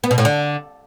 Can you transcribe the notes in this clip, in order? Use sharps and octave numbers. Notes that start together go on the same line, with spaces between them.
B3
B2
A2
D3